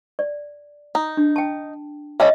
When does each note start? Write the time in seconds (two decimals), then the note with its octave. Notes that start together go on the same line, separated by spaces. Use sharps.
0.19 D5
0.95 D#4
1.17 D4
1.36 G5 A5
2.20 G3 C#4 A4 D#5 E5